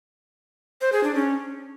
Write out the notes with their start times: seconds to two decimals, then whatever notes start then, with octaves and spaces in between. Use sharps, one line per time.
0.81 C5
0.92 G#4
1.04 D4
1.15 C#4